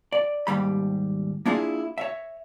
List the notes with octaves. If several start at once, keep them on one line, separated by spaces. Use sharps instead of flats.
D5
D#2 G#2 G3 B5
A#3 D4 E4 F4 G#4
C#5 E5